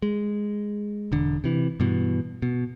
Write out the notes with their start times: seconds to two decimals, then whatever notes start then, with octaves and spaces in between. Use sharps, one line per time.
0.02 G#3
1.12 E1 D3
1.44 C3 E3
1.80 G2 B2 E3
2.42 B2